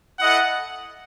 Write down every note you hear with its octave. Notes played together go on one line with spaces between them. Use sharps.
E4 A4 D#5 F#5